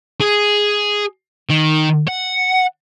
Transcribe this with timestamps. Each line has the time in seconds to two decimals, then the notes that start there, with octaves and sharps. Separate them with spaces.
0.20 G#4
1.50 D#3
2.08 F#5